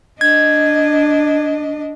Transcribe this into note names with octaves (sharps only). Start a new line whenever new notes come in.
D4 D#5 G#6